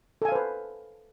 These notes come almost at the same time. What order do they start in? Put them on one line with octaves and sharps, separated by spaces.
A4 G#5 F5 C5 B4